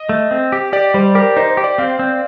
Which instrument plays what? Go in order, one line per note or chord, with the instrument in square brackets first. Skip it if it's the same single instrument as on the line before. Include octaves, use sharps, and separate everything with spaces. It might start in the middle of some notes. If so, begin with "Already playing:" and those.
Already playing: [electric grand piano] D#5
[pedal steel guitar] A3
C4
G4
[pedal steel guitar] G4 [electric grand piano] D5
[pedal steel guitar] G3 [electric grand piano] C5
[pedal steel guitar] G4 [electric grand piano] A#4
[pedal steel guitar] D#4 [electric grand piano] C5
[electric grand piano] C5
[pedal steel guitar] G4
[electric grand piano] D5
[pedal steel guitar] C4 [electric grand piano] F5
[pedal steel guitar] C4